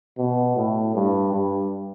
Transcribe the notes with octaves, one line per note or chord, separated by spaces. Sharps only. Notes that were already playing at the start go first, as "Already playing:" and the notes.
B2
A2
G2
G2